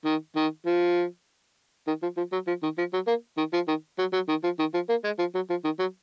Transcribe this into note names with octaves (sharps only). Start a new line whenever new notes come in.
D#3
D#3
F3
D#3
F3
F3
F#3
F3
D#3
F3
F#3
A#3
D#3
F3
D#3
F#3
F#3
D#3
F3
D#3
F3
A#3
G#3
F3
F#3
F3
D#3
F#3